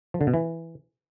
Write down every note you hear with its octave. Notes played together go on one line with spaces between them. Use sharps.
F3
D3
B2
E3